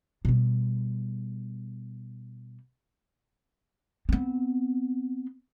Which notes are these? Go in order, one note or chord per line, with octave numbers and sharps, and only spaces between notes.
B2 G3
B3 C4